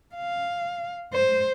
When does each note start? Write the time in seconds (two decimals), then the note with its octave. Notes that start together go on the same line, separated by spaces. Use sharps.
0.15 F5
1.13 C5